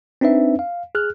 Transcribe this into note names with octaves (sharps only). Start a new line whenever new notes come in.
C4 D4 D#4 B4 E5
F5
G#4 F6 F#6